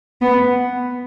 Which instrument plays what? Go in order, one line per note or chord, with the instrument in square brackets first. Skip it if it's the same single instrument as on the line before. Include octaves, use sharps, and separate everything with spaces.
[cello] B3